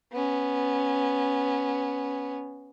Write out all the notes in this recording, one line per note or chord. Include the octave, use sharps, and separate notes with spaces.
B3 C#4